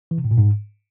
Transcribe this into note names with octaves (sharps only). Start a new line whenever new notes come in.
E3
C3
A2
A#2
G#2